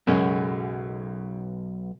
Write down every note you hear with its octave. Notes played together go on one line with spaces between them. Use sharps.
B1 F#2 C#3 G#3